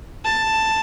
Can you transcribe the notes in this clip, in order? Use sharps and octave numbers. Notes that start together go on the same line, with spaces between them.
A5